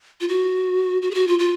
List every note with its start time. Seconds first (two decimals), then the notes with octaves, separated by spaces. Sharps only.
0.21 F4
0.29 F#4
1.02 F#4
1.11 G#4
1.14 F#4
1.28 F4
1.39 F4